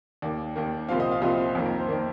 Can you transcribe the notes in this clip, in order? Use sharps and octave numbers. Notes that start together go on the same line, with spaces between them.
D#2 D#3 A#3 D5
D#2 D#3 A#3
C2 A#2 F3 C4 F5
D#5
F5
C2 A#2 F3 C4 D#5
F2 D#3 A#3
A#4
C5
D#3 A#3 D5